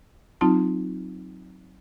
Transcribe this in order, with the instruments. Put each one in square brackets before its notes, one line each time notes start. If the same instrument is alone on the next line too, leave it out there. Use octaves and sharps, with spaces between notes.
[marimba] F#3 C4 D#4 F4 A5